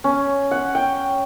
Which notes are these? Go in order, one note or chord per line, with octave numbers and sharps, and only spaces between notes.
C#4
F#5
G5